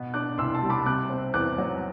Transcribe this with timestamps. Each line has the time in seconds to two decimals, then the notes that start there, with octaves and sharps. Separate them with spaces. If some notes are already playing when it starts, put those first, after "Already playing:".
Already playing: B2 B3
0.14 D4 D6 F#6
0.38 C2 C6 E6
0.54 A5 C6
0.63 G3
0.69 B5 D6
0.86 C3 D6 F#6
1.10 C4
1.34 E2 D6 F#6
1.58 F#3